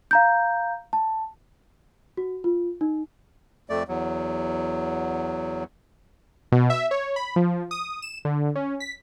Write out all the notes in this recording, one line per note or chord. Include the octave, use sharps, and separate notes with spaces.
F5 A#5 G6
A5
F#4
F4
D#4
F2 A3 D5
E2 F#3
B2
E5
C#5
B5
F3
D#6
E7
D3
C#4
B6